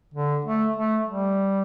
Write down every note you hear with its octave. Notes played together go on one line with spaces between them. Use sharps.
D3
A3
A3
G3